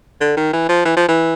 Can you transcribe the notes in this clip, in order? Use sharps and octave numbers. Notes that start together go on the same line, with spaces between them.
D3
D#3
E3
F3
E3
F3
E3